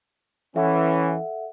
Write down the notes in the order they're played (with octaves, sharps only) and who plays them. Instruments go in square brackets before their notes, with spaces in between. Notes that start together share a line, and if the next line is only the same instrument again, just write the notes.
[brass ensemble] E3 C#4 [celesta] A4 E5 F#5